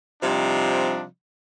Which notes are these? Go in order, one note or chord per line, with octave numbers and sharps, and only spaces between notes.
C3 F3 G3 D4 D#4